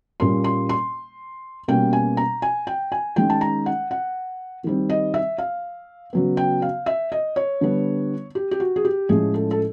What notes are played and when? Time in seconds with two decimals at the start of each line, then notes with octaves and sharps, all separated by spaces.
0.20 A#2 G3 A#3 C#4 C6
0.44 C6
0.69 C6
1.68 B2 G3 A#3 C#4 G5
1.93 G#5
2.17 A#5
2.42 G#5
2.67 G5
2.92 G#5
3.16 D#3 G#3 C#4 G5
3.30 A5
3.41 A#5
3.66 F#5
3.91 F#5
4.64 D#3 G3 C4
4.90 D#5
5.14 E5
5.38 F5
6.13 C#3 F#3 B3
6.37 G5
6.62 F5
6.86 E5
7.12 D#5
7.36 C#5
7.61 D3 G3 B3
8.35 G4
8.51 G4
8.60 F#4
8.76 G#4
8.85 G4
9.09 A2 F3 G#3 C#4 G#4
9.34 A4
9.51 A4